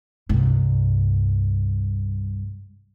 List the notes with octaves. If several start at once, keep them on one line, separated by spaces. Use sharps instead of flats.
C2 G2